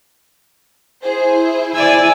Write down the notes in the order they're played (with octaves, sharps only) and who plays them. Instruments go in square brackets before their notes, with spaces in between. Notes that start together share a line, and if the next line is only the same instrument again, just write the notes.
[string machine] E4 [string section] G#4 C5
[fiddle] D5 E6 [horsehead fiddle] G#5